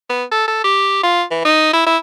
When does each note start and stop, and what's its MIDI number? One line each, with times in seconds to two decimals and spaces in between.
0.10 0.24 59
0.32 0.46 69
0.47 0.62 69
0.64 1.02 67
1.03 1.23 65
1.31 1.43 52
1.45 1.71 63
1.73 1.82 64
1.86 1.97 64